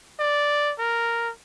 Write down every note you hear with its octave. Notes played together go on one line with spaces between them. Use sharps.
D5
A#4